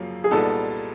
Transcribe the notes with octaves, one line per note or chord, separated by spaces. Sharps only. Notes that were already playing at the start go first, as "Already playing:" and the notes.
Already playing: F#2 C#3 F3 A#3
G#4
C2 A#2 G3 B3 D#4 A4